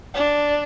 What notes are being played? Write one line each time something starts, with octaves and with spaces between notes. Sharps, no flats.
D4